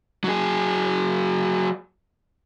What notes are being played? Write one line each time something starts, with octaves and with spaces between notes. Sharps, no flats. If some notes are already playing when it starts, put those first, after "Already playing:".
F#3 G#4